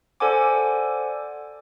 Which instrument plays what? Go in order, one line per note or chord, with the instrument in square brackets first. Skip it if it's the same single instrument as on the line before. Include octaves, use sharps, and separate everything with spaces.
[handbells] A4 C5 D5 F#5 G#5 D6